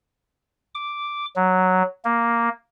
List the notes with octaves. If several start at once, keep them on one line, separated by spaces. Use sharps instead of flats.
D6
F#3
A#3